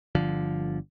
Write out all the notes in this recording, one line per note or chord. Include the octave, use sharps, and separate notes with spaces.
G1 D3 F3